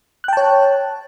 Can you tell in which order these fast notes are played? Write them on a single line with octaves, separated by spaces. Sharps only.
F#6 G5 A5 C#5